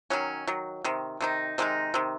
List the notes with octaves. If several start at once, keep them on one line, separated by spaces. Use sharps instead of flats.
D#3 F#3 C#4
D#3 F#3
C3 D#3
C3 D#3 D#4
C3 D#3 G#3 D#4
C3 D#3